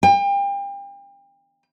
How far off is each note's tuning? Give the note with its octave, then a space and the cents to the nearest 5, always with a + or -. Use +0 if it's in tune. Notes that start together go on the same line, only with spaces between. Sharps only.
G5 +35